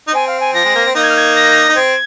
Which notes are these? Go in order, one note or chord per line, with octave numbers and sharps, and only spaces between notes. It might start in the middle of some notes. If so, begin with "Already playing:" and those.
D#4
C4 G#5
F5
G#5
F3 A#6
G#3
A#3
C4
A#3 D#4 A#6
G#6
F6
G#6
A#6
D#4
C4 G#6